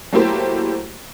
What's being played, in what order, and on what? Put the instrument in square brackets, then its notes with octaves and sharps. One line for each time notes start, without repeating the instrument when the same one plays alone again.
[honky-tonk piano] F#3 A3 A#3 E4 G4 C5